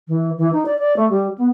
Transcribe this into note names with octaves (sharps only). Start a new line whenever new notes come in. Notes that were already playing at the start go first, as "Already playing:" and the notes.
E3
E3
D#4
D5
D5
A3
G3
B3